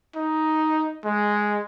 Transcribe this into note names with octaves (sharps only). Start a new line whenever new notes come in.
D#4
G#3